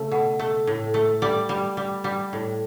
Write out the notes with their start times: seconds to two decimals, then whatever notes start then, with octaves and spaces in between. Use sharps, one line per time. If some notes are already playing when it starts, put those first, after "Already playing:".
Already playing: C#3 A3
0.11 B2
0.39 A3
0.67 A2
0.94 A3
1.22 G3 D5
1.49 G3
1.77 G3
2.04 G3
2.33 A2